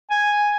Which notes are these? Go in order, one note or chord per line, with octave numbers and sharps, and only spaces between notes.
G#5